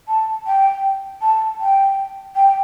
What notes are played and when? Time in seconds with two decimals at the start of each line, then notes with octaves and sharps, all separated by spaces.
0.08 A5
0.47 G5
1.22 A5
1.60 G5
2.36 G5